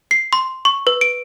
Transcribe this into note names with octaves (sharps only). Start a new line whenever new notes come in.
C7
C6
C#6
B4
D7